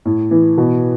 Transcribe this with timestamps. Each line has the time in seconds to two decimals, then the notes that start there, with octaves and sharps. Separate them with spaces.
0.05 A2
0.31 E3
0.58 B2